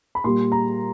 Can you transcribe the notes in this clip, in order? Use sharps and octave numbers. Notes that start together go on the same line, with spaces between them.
B5
A#2 G3 C6
A#5